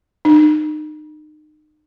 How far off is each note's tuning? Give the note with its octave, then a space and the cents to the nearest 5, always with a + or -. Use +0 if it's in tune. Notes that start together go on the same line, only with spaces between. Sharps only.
D#4 -35